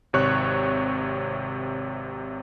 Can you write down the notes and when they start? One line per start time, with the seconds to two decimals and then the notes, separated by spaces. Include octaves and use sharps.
0.13 G#1 C3 C#5 C#6 F#6